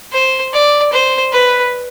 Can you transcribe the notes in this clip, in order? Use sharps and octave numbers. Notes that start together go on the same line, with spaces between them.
C5
D5
C5
B4